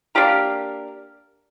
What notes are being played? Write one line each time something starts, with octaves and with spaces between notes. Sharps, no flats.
A#3 D4 G4 A#4